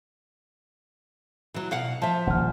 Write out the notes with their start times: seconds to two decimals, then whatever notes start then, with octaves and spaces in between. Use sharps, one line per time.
1.54 E3 F#3
1.71 B2 F5 F#5
2.02 F3 E5 A5
2.27 D#1 A#1 F#5 F6